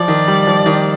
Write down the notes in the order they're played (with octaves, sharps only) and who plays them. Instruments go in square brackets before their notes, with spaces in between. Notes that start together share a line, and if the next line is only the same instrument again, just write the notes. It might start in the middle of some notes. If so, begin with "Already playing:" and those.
Already playing: [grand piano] F3 [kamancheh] D5
[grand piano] D#3
G3
F3
D#3